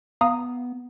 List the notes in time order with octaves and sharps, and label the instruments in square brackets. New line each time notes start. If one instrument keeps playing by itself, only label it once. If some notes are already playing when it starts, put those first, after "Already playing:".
[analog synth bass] B3 [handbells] F5 A#5 D#6